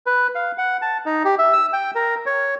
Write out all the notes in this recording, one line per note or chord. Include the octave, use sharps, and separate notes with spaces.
B4
F5
F#5
A5
D#4
G4
E5
E6
G5
A#4
C#5